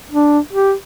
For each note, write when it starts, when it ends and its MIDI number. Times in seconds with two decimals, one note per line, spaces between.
0.12 0.39 62
0.53 0.73 67